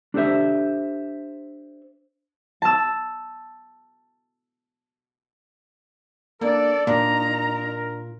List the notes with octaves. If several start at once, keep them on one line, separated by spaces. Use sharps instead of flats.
D4 G4 A4 C5 E5
A5 E6
A#3 D4 A4 D5
A#2 D4 D#4 A#4 A#5